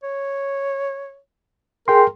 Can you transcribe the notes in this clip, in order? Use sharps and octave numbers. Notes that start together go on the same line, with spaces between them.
C#5
G#4 A#4 G5 C6